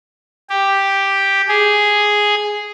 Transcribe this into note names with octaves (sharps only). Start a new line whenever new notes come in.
G4
G#4